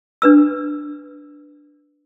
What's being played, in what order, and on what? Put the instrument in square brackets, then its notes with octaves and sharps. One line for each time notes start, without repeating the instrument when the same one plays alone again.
[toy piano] D4 B4 E6